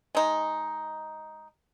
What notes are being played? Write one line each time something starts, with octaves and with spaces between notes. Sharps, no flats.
G#3 D#4